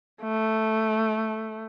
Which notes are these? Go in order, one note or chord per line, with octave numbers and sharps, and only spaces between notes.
A3